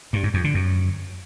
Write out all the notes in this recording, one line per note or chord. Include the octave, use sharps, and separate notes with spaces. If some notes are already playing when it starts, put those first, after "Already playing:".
G2
G#2
F2
D3
F#2